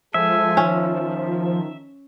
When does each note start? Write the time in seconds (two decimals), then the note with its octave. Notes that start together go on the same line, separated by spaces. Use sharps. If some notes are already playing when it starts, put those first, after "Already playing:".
0.14 F3 G#3 A4 E5 G#5
0.57 D#3 C#4